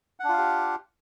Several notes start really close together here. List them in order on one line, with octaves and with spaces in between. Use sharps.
F#5 D4 F4 F5 G4